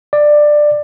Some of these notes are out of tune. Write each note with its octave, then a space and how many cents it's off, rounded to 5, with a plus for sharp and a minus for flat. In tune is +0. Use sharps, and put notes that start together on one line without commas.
D5 +15